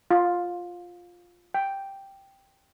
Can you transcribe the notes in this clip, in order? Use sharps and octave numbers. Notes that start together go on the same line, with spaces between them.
F4
G5